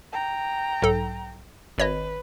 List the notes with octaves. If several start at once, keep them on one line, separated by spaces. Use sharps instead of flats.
G5 A#5
B1 G#2 A4
G#1 B4 C#5 D#5